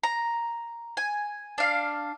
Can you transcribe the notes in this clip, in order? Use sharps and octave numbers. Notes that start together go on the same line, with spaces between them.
A#5
G#5
D4 F5